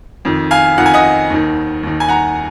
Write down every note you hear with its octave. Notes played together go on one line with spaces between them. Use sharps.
F2 D#3
F5 G#5
F2 D#3 F#5
G#5
D#5 F#5
D#2 D#3
D#2 D#3
G#5
F#5 A#5